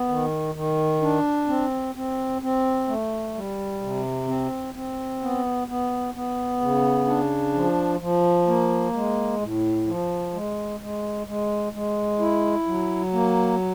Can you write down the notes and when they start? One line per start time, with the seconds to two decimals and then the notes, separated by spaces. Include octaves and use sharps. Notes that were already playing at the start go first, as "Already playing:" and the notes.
Already playing: B3
0.08 D#3
0.55 D#3
1.02 D4
1.48 C4
1.95 C4
2.42 C4
2.88 A3
3.35 G3
3.81 C3
4.27 C4
4.74 C4
5.21 B3
5.68 B3
6.14 B3
6.61 C#3
7.07 D4
7.54 F3
8.00 F3
8.47 A#3
8.94 G#3
9.41 A2
9.87 F3
10.33 G#3
10.80 G#3
11.27 G#3
11.73 G#3
12.20 E4
12.67 F#3
13.13 A#3